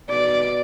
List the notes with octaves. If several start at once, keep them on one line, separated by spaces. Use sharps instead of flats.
B2 D5